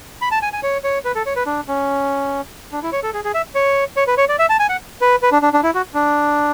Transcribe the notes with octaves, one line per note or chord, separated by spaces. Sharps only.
B5
A5
G#5
G#5
C#5
C#5
B4
A4
C#5
B4
D4
C#4
D4
E4
C#5
A4
G#4
G#4
E5
C#5
C#5
B4
C#5
D5
E5
A5
G#5
F#5
B4
B4
D4
D4
D4
E4
F#4
D4